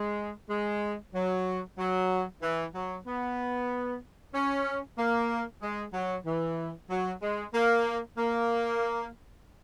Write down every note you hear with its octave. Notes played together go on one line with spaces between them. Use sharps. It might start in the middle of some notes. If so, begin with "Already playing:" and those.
Already playing: G#3
G#3
F#3
F#3
E3
F#3
B3
C#4
A#3
G#3
F#3
E3
F#3
G#3
A#3
A#3